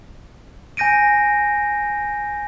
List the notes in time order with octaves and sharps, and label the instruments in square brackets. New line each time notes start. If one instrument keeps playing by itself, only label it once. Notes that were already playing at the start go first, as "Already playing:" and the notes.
[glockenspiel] G#5 G6 A#6 D7 D#7